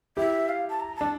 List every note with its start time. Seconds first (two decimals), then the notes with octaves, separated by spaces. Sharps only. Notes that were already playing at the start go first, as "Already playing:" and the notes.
0.17 E4 G4 E5
0.49 F5
0.70 A5
0.80 A#5
0.96 D4 A5